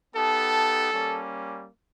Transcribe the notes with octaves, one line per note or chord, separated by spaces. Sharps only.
B3 D#4 G4 A4 A5
G3 A#3 C#4